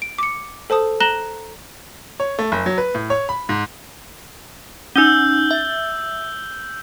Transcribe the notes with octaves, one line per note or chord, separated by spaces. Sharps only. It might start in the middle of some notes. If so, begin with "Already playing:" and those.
D7
D6 C#7
A4 C5 A5 D#6
A#5 F#6 A#6 E7 F#7 G7
C#5
A3
F#1
F#3
B4
A2
C#5
B5
G#2
C#4 D#4 E6 G6 G7
E5